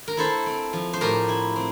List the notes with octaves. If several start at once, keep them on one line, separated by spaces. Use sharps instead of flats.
A#4
E4 A4 C5
C4
F3
C5
A2 G4 A#4
E4
C4